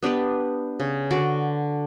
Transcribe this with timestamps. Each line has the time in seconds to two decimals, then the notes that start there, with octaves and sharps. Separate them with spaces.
0.03 B3 D4 G4 B4
0.80 C#3
1.11 D3 F#4 D5